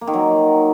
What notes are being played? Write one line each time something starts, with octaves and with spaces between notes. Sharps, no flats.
A#3
D#3
F#3